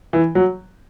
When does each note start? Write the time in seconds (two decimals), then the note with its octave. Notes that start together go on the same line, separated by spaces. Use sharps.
0.13 E3
0.35 F#3